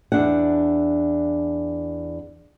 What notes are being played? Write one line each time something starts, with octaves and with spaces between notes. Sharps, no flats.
E2 D4 F#5